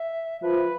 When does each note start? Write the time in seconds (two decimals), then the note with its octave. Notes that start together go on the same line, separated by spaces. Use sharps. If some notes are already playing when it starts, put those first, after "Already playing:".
Already playing: E5
0.41 F3 B4